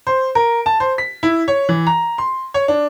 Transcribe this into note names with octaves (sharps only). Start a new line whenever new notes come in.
C5
A#4
A5
C5
B6
E4
C#5
E3
A#5
C6
C#5
D4